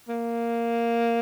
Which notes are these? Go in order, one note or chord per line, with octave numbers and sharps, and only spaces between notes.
A#3